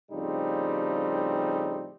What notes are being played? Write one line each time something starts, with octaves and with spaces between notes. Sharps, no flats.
A2 C#3 F3 G3 C4 D#4